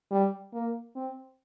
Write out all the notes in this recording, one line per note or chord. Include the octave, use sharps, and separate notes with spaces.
G3
A#3
C4